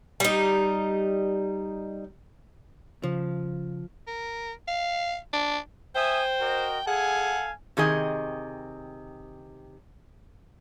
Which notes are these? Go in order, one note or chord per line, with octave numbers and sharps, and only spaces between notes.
G3 D#4
C#3 F3
A#4
F5
D4
C5 E5 G5 G#5 D#6
F#4 A#4 D#5
G#4 A4 F5 F#5 G#5
C3 D#3 G#4 D#5